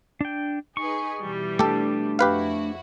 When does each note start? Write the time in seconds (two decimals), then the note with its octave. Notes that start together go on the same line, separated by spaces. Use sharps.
0.21 D4 G5
0.77 D#4 G#4 B4 C#6
1.22 B2 E3 G3
1.59 A3 D4 G4 A4
2.19 F2 E4 F#4 G4 B4 F5